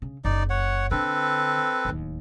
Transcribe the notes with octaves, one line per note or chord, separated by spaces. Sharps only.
C#3
F#1 D#4 D5
C#5 F#5
D3 C4 A4 B4
D1 D#2